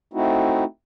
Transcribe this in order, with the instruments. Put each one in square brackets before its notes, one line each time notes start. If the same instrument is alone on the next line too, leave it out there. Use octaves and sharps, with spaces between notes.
[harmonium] A3 C4 D#4 E4 F#4